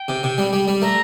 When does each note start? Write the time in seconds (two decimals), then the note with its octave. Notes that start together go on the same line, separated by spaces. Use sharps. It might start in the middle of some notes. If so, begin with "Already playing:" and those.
Already playing: G5
0.08 C3
0.23 C3
0.38 G3
0.53 G3
0.68 G3
0.82 A3 A#5